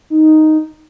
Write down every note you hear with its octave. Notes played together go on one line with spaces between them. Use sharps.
D#4